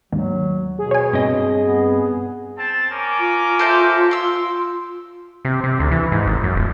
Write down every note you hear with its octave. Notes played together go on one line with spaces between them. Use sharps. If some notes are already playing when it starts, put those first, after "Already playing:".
D#2 G#2 F#3
B2 G#4
C#5 G#5
G2 C4 D#5
B3
C4 A5
C#4 A#4 D6
F4
A4 C5 E5
C6 E6
C3
C3
D2
E3
G#2
G#1
F#2
D#1